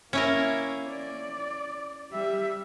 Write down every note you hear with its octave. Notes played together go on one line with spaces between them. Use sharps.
A#3 C#4 E4 A#4
D5
G3 E5